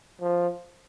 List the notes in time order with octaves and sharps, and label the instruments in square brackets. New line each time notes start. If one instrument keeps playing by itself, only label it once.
[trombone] F3